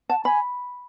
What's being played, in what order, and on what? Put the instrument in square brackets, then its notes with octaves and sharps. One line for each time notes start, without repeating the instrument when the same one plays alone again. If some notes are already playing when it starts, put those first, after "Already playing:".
[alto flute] F#5 [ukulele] A5
[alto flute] G#5 [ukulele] B5